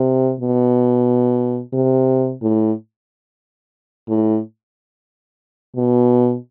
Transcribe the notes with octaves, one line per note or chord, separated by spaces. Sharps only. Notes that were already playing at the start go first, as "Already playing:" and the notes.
Already playing: C3
B2
C3
A2
A2
B2